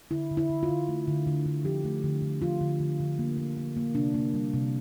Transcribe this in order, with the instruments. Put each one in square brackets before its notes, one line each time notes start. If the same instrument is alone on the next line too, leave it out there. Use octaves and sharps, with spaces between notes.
[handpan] D3 E4
D3
E4
D3
F4
D3
A3
D3
D3
D3
F3 G4
A3
D3
D3
F3 F4
D3
D3
D3
A#3
A#3
A#3
A#3
C3 D4
A#3
G3
C3